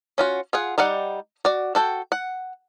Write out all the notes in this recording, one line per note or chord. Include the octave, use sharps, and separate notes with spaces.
C#4 F4 F#4
F4 G#4 F#5
G3 D#4 D5 F#5
F#4 D5
F#4 A4 G5
F#5